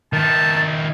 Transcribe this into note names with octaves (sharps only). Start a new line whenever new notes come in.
D#3 E4 A5